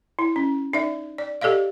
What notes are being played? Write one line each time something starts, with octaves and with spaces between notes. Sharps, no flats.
E4
C#4
D#4 D5 E5
D5
G4 A4 D5 D#5 F5